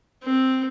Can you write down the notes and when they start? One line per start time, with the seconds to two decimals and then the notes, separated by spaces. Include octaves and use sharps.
0.23 C4